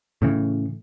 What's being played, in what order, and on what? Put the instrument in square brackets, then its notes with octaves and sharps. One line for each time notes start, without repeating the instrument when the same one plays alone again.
[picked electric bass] A2 C#3 E3